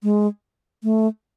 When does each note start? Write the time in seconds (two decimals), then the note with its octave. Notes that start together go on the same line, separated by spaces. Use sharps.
0.03 G#3
0.83 A3